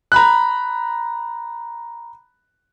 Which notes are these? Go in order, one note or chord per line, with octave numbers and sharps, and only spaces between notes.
A#5 B5 F#6